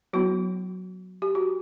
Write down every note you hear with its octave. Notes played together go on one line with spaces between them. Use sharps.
F#3 B3 E4 F#4
G4
F#4